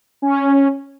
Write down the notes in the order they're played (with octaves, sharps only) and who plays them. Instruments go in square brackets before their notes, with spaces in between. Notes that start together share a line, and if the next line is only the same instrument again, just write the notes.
[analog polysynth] C#4